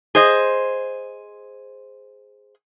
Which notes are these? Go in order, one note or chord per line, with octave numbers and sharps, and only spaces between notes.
G#4 C5 D#5